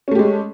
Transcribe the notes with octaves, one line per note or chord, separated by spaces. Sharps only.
G#3 A3 C#4 G4